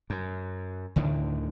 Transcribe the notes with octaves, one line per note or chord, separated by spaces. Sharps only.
F#2
D2 A2 D3 D#3